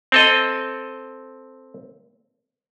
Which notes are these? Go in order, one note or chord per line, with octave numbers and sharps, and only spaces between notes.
C4 A4 D#5